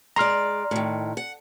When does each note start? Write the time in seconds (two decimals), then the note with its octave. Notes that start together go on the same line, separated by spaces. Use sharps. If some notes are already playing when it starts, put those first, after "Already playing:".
0.16 G#3 D5 A#5 C6 F6
0.71 A2 D#3
1.17 F#5